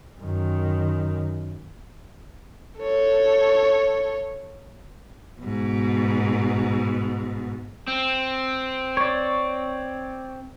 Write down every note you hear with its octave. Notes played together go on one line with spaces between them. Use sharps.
F#2 D#3
A4 C#5
G#2 B2
C4
C#5 D5